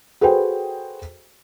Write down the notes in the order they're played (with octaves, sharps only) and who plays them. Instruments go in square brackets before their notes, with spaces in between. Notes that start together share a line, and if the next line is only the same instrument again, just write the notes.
[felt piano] F#4 G#4 A4 B4 C5 G5